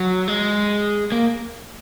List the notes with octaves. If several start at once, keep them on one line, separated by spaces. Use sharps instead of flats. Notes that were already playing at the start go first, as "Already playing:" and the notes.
Already playing: F#3
G#3
A#3